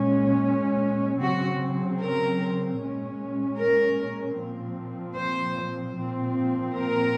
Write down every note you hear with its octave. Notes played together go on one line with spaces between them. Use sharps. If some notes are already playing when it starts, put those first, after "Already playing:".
Already playing: A#2 G#3 C#4
C#3 F#3 C4 F#4
A#4
A#2 G#3 C#4
A#4
A#2 F3 C4
C5
A#2 F3 C4
A#4